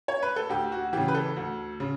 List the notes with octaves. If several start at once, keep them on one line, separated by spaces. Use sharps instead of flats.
C#5
B4
A4
D2 G4
F#4
C#3 E3 G4
B4
A4
D2
C#3